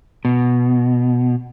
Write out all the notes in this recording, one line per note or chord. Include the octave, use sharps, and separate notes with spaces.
B2